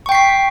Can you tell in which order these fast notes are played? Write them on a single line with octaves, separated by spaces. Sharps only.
C#6 G5 C7 B6